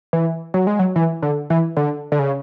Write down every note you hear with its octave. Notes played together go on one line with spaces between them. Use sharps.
E3
F#3
G#3
F#3
E3
D3
E3
D3
D3
C#3